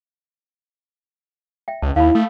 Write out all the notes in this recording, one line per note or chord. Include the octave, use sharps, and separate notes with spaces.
E5 G5
C#2 A5
D#2 E4 F5 A5 B5
A3 D#6